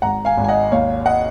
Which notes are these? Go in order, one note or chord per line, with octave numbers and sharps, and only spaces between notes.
G#1 F#5 A#5
F5 G#5
G#1
G#5
D#5 F#5
D#2 C#5 F5
D#5 F#5